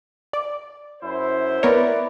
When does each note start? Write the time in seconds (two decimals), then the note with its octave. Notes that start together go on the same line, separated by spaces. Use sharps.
0.33 D5
1.02 F#2 E4 C5
1.63 B3 E4 A#4 B4 C#5 D5